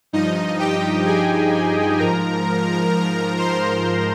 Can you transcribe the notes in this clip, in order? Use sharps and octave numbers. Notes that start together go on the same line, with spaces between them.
G2 F3 D#4 D#5
G4 G5
G#4 G#5
G#4 G#5
G#2 F3 A#4 A#5
C5 C6